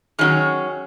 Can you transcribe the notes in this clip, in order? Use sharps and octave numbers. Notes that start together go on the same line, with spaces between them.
D#3 F#3 C#4 G#4